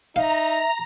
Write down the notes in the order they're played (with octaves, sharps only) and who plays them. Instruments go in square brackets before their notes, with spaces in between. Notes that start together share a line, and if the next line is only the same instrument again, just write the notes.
[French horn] D#4 [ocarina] E5 [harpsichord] F5 [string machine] A#5